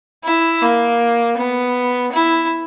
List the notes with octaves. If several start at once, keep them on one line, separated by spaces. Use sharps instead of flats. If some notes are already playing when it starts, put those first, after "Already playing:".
E4
A#3
B3
E4